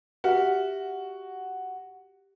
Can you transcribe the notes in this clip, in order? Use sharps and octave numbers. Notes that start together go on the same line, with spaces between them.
F#4 G4 E5 F6